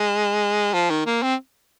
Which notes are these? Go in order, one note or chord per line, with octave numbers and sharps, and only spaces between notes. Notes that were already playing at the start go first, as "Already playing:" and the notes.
Already playing: G#3
F3
D#3
A#3
C4